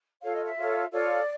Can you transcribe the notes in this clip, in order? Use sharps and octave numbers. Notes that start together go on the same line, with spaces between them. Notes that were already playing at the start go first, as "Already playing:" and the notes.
F4 A4 C#5 F5
D#5
E5
F4 A4 C#5
F4 A4 C#5 D5